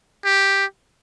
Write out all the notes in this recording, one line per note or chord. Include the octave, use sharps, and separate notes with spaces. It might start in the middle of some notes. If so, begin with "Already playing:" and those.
G4